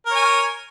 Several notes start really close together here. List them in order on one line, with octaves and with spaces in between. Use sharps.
A#4 C#5 G#5